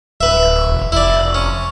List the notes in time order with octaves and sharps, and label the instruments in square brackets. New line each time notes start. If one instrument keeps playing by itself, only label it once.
[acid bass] D1 [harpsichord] B4 E5
[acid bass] E1
[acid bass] F1 [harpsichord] E4 D5
[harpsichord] C#4